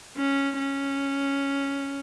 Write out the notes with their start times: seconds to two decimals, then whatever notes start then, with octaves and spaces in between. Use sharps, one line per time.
0.17 C#4
0.59 C#4